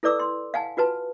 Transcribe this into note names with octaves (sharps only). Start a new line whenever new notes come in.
E4 A4 B4 D5 D6 E6
C6
F5 F#5 G#5 A5
F4 F#4 B4 A5